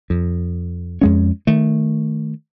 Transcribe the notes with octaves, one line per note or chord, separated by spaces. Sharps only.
F2
F2 G#3 C#4
D#3 A3